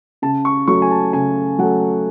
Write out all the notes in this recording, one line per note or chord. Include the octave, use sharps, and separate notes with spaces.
C#3 A5
C#6
F#3 A3 C#6
G#5
A5
C#3 G#5
F#3 A3 F#5